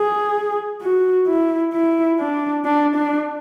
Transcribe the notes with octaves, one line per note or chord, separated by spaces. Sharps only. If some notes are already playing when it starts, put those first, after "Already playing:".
Already playing: G#4
F#4
E4
E4
D4
D4
D4